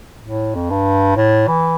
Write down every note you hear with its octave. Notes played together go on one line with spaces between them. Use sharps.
A2
F2
G2
A2
E3